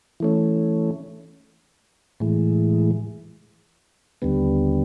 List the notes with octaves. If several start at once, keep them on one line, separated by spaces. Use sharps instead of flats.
E3 A3 C#4
A2 E3 G#3
D#2 D3 G3 B3